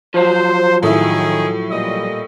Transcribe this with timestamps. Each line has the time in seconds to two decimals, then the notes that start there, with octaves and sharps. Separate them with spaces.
0.14 F3 F#3 C5
0.83 A2 D#3 E4 G#4
1.71 A#2 G3 D#5